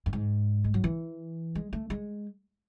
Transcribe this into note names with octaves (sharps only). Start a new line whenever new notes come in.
F#2
G#2
G#3
F#3
E3
G#3
A3
G#3